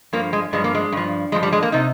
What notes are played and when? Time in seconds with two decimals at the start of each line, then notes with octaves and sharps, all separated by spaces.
0.13 G2 F3 A#3
0.33 G#3
0.53 G2 F3 G#3
0.64 A#3
0.75 G#3
0.92 G2 F3
1.32 G2 G#3
1.35 F3
1.43 G3
1.53 G#3
1.63 A#3
1.72 C3 D#4